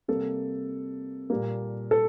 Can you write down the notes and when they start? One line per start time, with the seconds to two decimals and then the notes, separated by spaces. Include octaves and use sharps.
0.08 C3 G3 A#3 A4
1.30 A#2 G3 A#3
1.91 A4